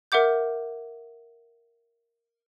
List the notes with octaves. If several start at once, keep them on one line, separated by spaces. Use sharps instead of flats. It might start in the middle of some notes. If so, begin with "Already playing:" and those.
A#4 E5 F#5 D6 G6